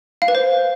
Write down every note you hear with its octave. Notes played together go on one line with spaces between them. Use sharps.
F5
B4
C5